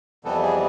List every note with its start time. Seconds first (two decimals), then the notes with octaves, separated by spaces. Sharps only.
0.24 F2 C3 E3 G3 B3 A4
0.43 G#4